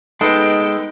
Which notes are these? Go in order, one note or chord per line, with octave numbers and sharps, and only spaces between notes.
G#3 B3 D#4 A4 B4 G5